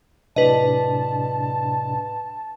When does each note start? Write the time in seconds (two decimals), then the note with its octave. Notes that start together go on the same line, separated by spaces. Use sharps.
0.36 A2 C3 D4 B4 D#5 A5